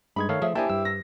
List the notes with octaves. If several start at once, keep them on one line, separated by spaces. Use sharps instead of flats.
G2 G#3 D#4 B5 G#6
D#3 A3 A4 C#5 F5
F3 A3 G#4 E5
A#3 D4 E4 G4 C5 D#5 G#5 A5
G2 E6
A#6